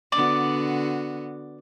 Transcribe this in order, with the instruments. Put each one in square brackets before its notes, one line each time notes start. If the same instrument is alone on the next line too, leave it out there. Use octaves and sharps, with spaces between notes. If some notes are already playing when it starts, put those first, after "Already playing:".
[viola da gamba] D3 B3 F#4 [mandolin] D5